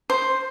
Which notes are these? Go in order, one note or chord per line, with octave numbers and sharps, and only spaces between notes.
C5